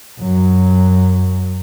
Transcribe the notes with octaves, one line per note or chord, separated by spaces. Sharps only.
F#2 F#3